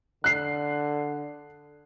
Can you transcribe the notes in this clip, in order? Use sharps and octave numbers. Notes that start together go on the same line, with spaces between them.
D3 F#6 C7